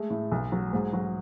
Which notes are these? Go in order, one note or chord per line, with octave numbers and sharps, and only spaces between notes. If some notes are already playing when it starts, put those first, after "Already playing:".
Already playing: G#3 A3
A2
B1
F#3
G#2
F#3